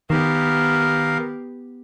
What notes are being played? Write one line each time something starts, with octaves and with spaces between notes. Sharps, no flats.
D#3 B3 G4 A#4 F5